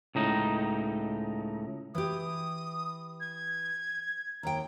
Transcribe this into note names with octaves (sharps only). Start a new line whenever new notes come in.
C#2 A2 D#4
E3 G4 D#6
G#6
D#2 G5 A#5